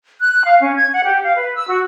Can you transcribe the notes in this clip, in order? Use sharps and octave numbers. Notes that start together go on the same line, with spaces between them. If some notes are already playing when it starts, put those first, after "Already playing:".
F#6
F5
C#4
G#6
F#5
G4
F5
B4
E6
F#4